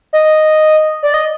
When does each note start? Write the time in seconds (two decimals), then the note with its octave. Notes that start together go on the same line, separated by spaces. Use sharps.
0.13 D#5
1.03 D5
1.14 D#5